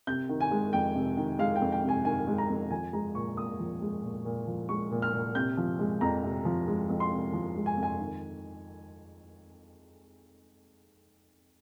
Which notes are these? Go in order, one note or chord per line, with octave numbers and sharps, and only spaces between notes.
C3 G6
D#3
G#5
G#3
F2 G5
C3
D#3
G#3 F5
G5
F2
G5
C3
G#5
D#3 G#5
G#3
A#5
F2
F3 G#5
G#3 A#5
A#2 C#6
A#2 D#6
F3
G#3
A#2
A#2
F3
G#3 C#6
A#2
F6
A#2
C3 G6
F3
G#3
F2 A#5
C3
F3
G#3
F2
C6
C3
F3
G#3
G#5
F2
G#5
D#3